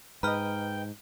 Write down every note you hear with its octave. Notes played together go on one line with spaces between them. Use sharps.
G#2 B4 D#5 G5 A#5 F6